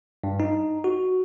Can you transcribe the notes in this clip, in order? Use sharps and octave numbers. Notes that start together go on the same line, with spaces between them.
G2
D#4
F#4